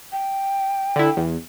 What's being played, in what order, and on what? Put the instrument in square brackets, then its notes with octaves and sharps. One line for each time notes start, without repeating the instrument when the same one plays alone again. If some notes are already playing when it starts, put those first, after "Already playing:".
[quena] G5
[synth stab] D3 E4
E2